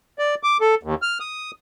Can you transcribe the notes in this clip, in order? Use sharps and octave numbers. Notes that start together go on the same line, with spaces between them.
D5
D6
A4
D#2
F6
D#6